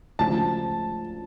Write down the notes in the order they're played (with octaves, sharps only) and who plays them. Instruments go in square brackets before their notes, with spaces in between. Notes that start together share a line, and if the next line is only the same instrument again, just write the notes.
[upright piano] D2 C#3 F3 G#3 [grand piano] A5